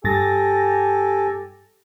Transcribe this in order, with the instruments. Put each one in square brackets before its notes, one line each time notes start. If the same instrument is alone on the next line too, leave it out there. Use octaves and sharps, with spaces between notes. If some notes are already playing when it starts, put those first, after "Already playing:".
[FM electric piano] G2 A6 A#6 [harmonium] G4 A4 G#5